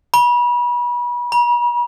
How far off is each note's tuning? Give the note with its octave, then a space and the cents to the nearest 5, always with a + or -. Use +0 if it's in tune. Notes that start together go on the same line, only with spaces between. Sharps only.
B5 -35
B5 -45